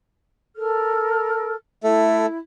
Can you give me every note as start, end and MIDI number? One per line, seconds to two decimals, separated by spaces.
0.55 1.52 69
0.55 1.52 70
0.55 1.52 89
1.84 2.26 57
1.84 2.37 64
1.84 2.26 69